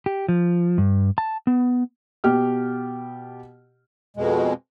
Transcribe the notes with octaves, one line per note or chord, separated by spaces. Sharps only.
G4
F3
G2
A5
B3
B2 B3 G4 F6
F2 B2 G#3